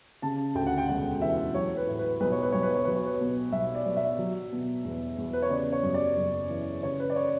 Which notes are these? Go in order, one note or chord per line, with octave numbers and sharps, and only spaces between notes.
C#3 A5
D2 G5
F#5
G5
E1 F#5
E3 E5
F#3 C#5
B4
A2
B4
B1 B4
C#5
B4
B1 C#5
B4
C#5
F#3 B4
C#5
B4
B2
B1 E5
D5
B1
E5
F#3
B2
E2
E2
B4
C#5
C#3 D5
C#5
F#2
D5
F#1
E3
C#3 C#5
B4
D5
C#5